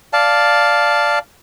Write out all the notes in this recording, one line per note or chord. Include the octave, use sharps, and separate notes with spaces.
D5 F5 A5